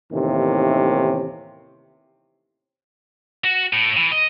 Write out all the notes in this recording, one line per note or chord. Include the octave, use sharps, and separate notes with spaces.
D#2 A2 C3 D#3 E3 C#4
F#4
A2
E3
D#5